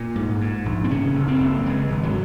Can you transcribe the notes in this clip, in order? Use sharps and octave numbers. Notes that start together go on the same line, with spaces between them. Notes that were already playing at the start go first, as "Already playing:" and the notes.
Already playing: A#2 A#3
G#2
G#2
A#1
C4
C#3 C#4
F#1
C4
F#1
C#3 G#3
G#1
F#3